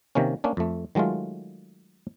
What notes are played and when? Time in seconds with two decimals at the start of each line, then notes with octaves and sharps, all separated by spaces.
0.15 C3 D#3 A#3 C#4
0.44 A#3 C#4 D4
0.57 F2 A3
0.95 D#3 F#3 G#3 A3 F4